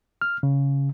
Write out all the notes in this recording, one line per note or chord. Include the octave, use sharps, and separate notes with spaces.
F6
C#3